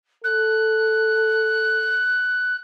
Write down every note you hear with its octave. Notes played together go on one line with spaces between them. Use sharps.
A4 F#6